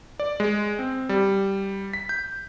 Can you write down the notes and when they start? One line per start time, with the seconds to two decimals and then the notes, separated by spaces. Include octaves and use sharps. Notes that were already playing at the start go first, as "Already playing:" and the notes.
0.20 D5
0.40 G#3
0.79 C4
1.09 G3
1.93 B6
2.09 G6